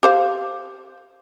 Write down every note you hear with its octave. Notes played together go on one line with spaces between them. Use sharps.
G4 C5 F5